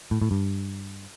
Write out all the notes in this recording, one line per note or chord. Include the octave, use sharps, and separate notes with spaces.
A2
A2
G2